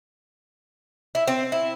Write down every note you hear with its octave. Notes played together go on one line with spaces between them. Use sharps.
E4
C4
E4